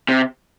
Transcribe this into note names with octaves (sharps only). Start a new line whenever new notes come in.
C3